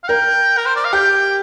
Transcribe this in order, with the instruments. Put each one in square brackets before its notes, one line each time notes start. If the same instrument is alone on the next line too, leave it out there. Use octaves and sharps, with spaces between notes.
[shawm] F5
[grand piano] A#4 [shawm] G5
[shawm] A#4
C5
D5
F5
[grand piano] G4 [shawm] G5